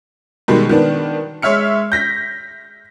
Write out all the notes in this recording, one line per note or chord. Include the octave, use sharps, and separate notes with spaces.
B2 D#3 G3 G#3
D#3 B3 D4
G#3 C#5 E5 F6 C#7
G6 A#6 B6